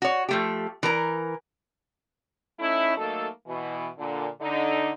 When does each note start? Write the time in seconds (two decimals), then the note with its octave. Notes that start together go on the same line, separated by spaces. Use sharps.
0.02 F#4 C#5
0.29 F3 A3 G4
0.83 E3 A#4 A#5
2.59 A3 C#4 D#4 E4
2.97 F#3 A3 A#3 D#4 A4
3.47 B2 E3
3.98 A#2 D3
4.41 D3 D#4